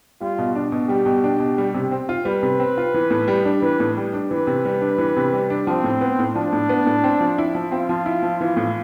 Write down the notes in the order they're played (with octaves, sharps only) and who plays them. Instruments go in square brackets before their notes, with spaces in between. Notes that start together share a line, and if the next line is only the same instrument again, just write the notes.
[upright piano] G3 [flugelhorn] F4
[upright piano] B2
D4
B2
[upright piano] G3 [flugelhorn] G4
[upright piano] B2
D4
B2
G3
C3
C4
F4
[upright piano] G3 [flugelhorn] B4
[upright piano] C3
C4
F4
E3
A2
G3
D4
[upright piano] E3 [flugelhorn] B4
[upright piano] A2
G3
D4
[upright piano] E3 [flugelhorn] B4
[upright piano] C3
G3
D4
E3
C3
G3
D4
[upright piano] F3 [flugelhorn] C4
[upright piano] A2
B3
A2
[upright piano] F3 [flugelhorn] D4
[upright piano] A2
B3
A2
C4
F3
E4
F3
[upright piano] C4 [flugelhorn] F4
[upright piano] F3
E4
F3
E3
A2